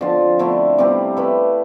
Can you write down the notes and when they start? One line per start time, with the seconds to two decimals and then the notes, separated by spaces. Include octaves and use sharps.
0.01 D3 F3 C4 F4
0.39 D3 A3 C4 E4
0.78 C3 G3 C4 G4
1.17 A3 E4 B4